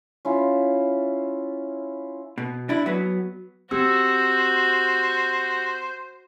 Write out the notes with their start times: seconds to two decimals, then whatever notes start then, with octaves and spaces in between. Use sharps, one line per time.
0.25 C#4 E4 F4
2.38 B2
2.69 D4 E4
2.86 F#3 B3
3.71 C4 F#4 G4 C5 E6